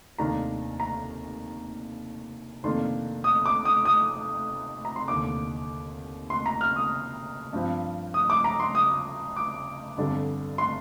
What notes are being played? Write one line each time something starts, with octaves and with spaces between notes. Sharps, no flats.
F1 D#2 D#3 A#3 D4 A#5
A#5
F1 F2 D#3 A#3 D4 C6
D#6
D6
D#6
D#6
A#5
C6
F1 D#2 D3 D6
C6
A#5
F6
D#6
G2 F3 C4
D#6
D6
A#5
C6
D#6
D6
G1 F2 D3 G3 D4
C6